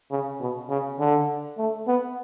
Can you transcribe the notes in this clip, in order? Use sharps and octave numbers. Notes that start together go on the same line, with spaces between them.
C#3
B2
C#3
D3
A3
B3